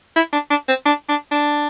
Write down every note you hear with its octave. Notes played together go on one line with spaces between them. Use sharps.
E4
D4
D4
C4
D4
D4
D4